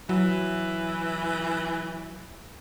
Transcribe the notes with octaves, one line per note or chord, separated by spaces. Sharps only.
E3 F#3